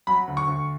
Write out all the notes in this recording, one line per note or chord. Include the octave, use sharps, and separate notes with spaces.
F#3 B5
D2
C#6
D2